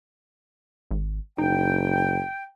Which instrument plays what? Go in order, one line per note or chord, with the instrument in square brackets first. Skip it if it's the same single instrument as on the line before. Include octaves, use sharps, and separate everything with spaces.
[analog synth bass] G#1
[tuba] F#1 [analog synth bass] D#4 [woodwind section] G5